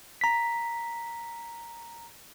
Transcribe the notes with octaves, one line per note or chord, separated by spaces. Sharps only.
A#5 B6